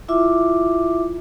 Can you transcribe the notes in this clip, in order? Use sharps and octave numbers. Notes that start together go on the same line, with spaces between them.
E4 F4 E5 D6